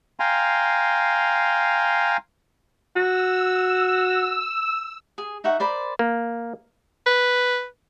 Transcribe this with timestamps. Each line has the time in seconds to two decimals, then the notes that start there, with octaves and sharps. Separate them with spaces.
0.20 F5 G5 G#5 A#5 C6
2.96 F#4 E6
5.18 G#4
5.44 D#4 E5 F#5 C#6
5.59 A#4 C5 D5 B5
5.99 A#3
7.06 B4